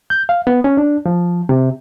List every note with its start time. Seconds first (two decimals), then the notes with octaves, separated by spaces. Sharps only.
0.10 G6
0.29 F5
0.47 B3
0.64 C#4
0.77 D4
1.06 F3
1.49 C3